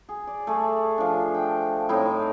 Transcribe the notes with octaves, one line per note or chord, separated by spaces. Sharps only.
G#4
D5
A3 G#4
F3 D4
G5
A2 C4 D#4 E4